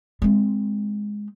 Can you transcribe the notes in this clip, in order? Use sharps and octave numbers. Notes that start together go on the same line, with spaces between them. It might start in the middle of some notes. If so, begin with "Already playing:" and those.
G#3 C4